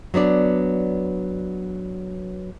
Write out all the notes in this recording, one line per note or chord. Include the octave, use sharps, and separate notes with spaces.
F#3 B3 D4 D5